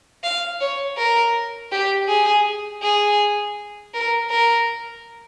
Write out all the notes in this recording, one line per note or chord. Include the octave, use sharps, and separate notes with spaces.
F5
C#5
A#4
G4
G#4
G#4
A#4
A#4